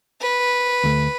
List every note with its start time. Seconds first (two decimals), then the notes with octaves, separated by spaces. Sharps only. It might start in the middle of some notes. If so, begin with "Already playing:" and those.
0.21 B4
0.84 D2 A3